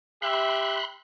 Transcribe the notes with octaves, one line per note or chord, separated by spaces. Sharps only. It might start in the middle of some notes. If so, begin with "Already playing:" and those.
G4 E5 B5 C6 F#6